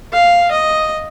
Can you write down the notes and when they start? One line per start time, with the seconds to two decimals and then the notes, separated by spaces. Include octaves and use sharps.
0.13 F5
0.51 D#5